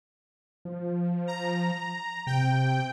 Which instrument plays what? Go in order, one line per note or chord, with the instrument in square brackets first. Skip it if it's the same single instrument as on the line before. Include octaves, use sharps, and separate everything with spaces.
[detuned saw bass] F3
[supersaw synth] A#5
[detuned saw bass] C3 [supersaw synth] G5